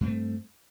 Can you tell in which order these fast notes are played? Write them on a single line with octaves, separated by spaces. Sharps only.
G2 C4 A3